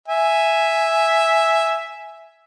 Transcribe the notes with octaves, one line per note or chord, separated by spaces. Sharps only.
E5 G#5